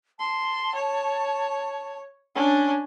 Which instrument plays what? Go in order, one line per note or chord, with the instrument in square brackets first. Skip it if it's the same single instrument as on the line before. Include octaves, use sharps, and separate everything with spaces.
[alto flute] A5 [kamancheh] C6
[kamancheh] C#5
C#4 D4